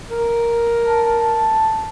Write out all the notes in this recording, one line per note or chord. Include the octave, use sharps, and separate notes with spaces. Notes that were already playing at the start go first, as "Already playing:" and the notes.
A#4
A5